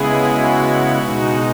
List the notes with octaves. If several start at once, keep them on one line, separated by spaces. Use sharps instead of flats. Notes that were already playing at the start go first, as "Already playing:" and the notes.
Already playing: C#3 G#3 B3 E4 G#4
F#4
B2 G#3 D#4